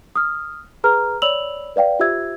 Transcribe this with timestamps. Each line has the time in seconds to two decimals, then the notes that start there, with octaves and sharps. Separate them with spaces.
0.16 D#6 F6
0.84 G#4 B4 A#5 F6
1.22 C#5 D5 B5 E6 F7 F#7
1.76 B4 D5 F5 G5
1.99 F4 G4 C5 E5 E6 G#6